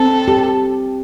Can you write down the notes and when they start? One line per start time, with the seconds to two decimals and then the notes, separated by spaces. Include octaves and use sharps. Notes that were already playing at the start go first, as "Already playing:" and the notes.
Already playing: C4 A4
0.28 G4